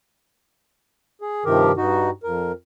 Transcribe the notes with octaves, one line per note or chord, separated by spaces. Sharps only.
G#4
G2 C3 D#3 F3 G4 A#4
G2 D#4 F#4
F2 A#4